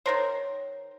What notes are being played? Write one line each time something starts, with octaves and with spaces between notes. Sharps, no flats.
D#3 A#4 C5 C#5